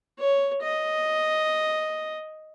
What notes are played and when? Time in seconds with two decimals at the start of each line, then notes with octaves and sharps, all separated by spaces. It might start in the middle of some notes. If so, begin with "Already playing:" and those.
0.19 C#5
0.62 D#5